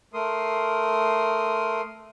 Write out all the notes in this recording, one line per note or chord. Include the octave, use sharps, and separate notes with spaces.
A3 A#4 C6 D#6